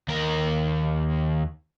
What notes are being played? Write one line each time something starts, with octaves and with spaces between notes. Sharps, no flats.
D#2 A#4